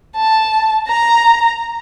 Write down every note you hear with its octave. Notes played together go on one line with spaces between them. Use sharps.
A5
A#5